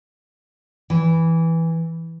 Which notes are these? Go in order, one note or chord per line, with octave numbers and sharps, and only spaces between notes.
E3